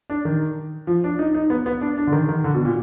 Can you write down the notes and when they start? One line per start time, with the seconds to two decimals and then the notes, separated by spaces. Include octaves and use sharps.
0.10 D4
0.25 D#3
0.87 F3
1.04 D4
1.19 D#4
1.35 D#4
1.50 B3
1.66 B3
1.81 D4
1.98 D4
2.07 D3
2.12 D#3
2.29 D#3
2.44 D3
2.54 B2
2.65 A#2